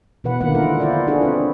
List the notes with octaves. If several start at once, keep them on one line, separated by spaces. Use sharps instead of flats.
B2 E3 B4 F#5
D3 D#3 F3 A#3 B4 F#5
G#3 E4 F4 A#4 F#5
E4 F4 C5 D5
D4 E4 F#4 G#4 A4
C4 E4 B4